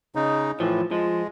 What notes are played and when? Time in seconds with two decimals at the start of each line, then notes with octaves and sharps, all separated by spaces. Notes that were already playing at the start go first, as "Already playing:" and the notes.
0.15 C#3 D#4
0.60 A2 E3 F3
0.91 F3 G#3